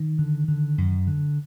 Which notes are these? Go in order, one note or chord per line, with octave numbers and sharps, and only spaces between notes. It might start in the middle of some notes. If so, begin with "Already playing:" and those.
Already playing: D#3
D3
D3
F#2
D3